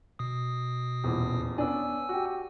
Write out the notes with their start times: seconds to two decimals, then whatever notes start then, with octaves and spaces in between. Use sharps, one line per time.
0.19 B2 D#6
1.04 D#1 E2
1.58 B3 C#4 D4 G#5 E6
2.09 F#4 G4